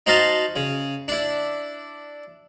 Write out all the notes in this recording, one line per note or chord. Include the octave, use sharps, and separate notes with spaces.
D#4 F#4 C5 D#5 F5 A5
C#3
D4 E4